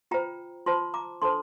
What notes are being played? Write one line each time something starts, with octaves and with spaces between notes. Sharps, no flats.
F4 C5 G5 A#5
F4 C5 A5 C6
A#5 D6
D4 A4 C5 A5 C6